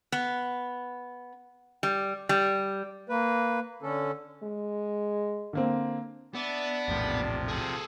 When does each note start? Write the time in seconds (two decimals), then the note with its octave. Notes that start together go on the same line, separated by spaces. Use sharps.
0.12 B3
1.83 G3
2.29 G3
3.09 A#3 B4
3.82 D3 C#4 A4
4.43 G#3
5.53 D3 A#3 C4
6.35 B3 D4 D5 E5
6.88 A#1 E2 A2 C3 F3
7.49 G#4 A4